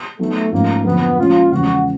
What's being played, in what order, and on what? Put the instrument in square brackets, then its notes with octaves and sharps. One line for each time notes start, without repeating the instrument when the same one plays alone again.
[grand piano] F#3 B3 D#4 [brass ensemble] A3
[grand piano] G#2 F3 A3 C#4 [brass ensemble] A#3
[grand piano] F2 D3 F#3 A#3 [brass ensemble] B3
[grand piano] A#2 F3 G#3 C#4 [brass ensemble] F4
[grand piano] E2 C#3 F3 G#3 C#4 [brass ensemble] F#4